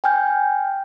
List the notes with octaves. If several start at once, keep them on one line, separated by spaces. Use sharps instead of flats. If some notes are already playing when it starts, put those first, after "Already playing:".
G5 G#5 F6 G6